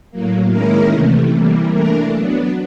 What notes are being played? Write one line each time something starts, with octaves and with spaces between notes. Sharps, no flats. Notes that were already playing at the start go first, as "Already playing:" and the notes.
A2 F#3 A#3
D#3 G#3 A#3 C#4 E4 A#4
C3 E3 A3
C3 E3 G3 A#3
E3 A3 A#3 D4 A#4
F#3 B3 D4